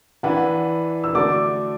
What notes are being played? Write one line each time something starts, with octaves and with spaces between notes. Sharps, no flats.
E3 D4 B4 F#5
E6
D3 A3 F#4 D5 D6